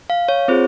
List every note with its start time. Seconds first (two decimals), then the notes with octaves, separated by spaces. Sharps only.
0.10 F5
0.28 C#5
0.48 C4 F4 G#4 C5